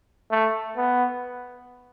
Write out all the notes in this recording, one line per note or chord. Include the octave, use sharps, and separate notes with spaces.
A3
B3